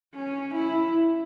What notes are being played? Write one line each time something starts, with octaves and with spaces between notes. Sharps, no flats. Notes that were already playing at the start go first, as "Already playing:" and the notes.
C#4
E4